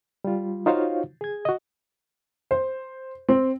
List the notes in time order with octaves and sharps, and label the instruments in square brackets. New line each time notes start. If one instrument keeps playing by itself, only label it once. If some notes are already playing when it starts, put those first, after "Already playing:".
[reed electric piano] G3 F4
D#4 F4 F#4 C5 C#5 F5
G#4 G#6
F#4 D#5
[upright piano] C5
C4